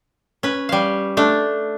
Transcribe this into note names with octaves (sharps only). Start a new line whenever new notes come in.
C#4 B4
G3 F5
A3 D4